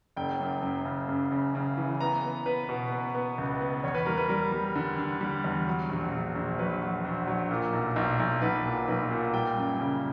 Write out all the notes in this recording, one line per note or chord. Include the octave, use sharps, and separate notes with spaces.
F#1 G5
F#2
F#2
C#3
F#2
C#3
C#3
E3
B3 A#5
B3
B3 B4
B2
B3
B3
C#2
B3
E2 C#5
B4
G3 A#4
B4
G3 A#4
G3
D3
D3
G3
E2
F#3
A#1
A#1
A#1
F#3 B4
F#3
A#1
F#3
A#2
B1
B1
B1
B1 B4
A#2
B1 B4
A#2
G3 G5
F#2
C#3